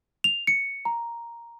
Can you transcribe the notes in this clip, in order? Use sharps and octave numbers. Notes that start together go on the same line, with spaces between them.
F7
C#7
A#5